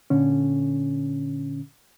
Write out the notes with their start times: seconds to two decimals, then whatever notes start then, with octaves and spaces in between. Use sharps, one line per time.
0.10 A#2 D3 C#4